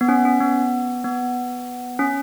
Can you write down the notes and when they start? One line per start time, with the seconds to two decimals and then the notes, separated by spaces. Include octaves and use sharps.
0.01 B3
0.09 C#4
0.25 C#4
0.40 B3
1.04 B3
1.99 C#4